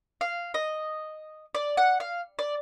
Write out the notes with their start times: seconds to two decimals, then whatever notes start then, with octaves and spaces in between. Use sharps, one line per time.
0.21 F5
0.54 D#5
1.55 D5
1.77 F#5
2.00 F5
2.39 D5